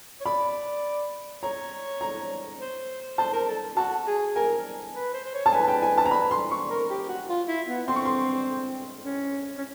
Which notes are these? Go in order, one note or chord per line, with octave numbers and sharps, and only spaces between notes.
C#5
D5 B5
C#5 A#5
A#5
C5
C5 A5
A#4
A4
F#4 A5
G#4
A#4 G#5
B4
C5
C5
C#5
A5
B4 G#5
G5
G#5
A5
A#5
B5
C6
C#6
A#4
G4
F#4
F4
E4
B3
C4 C6
C#6
C6
C#4
C#4